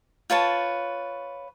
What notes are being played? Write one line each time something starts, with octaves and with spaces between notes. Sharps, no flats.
F4 B4 C#5 A5